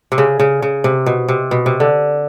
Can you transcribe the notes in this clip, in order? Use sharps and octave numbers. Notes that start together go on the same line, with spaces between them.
C3
C#3
C#3
C#3
C3
B2
C3
B2
C3
D3